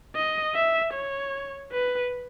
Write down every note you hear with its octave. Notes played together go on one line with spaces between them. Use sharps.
D#5
E5
C#5
B4